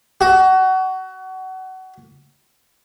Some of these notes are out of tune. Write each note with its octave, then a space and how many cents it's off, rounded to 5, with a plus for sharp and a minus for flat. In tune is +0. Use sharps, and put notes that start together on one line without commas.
F#4 +25